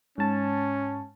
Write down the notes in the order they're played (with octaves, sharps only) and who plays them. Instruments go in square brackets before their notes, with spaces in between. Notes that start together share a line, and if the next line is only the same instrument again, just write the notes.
[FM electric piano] G#2 A5 [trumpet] C#4